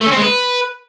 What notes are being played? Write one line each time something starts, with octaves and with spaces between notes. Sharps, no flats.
A3
C#4
C4
G#3
B4